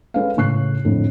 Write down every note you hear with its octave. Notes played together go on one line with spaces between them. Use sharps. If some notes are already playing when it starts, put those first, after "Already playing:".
G#3 C#4 A4 B4 D#5 F5
A2 C#3 C#6 F#6 C7
F2 A2 D3